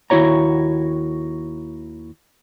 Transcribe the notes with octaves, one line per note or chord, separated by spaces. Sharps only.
D#2 E4 F#4 C#5 A#5